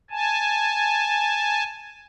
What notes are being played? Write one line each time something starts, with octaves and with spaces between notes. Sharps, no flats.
G#5 A5